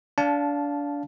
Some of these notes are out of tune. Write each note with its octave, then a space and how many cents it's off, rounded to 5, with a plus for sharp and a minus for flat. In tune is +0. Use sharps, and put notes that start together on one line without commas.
D4 -25 F5 +0 A5 -10